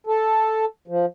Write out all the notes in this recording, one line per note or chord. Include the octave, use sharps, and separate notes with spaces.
A4
F3